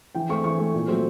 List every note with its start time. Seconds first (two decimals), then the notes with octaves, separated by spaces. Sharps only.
0.15 E3 G5
0.29 A3 C4 C#6
0.44 E3 C#6
0.59 A3 C4
0.74 A#2
0.88 F#3 A3 C4